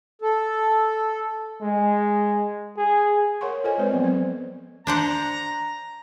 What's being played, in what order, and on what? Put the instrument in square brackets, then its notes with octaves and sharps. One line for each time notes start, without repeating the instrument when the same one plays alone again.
[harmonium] A4
[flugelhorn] G#3
G#4
[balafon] A#4 C#5 F#5 C6 C#6
F4 A4 C5 C#5 D#5 G#5
G#3 C4 B4 C5 D5
F3 F#3 B3 C4
C4 C5
[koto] D4 C5 F#5 [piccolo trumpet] A#5